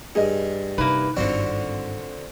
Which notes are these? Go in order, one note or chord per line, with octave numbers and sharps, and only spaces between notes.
G2 G#4 D#5
C3 A#3 D#4 E4 B4
G#1 G2 D3 C4 F4 F#4 D5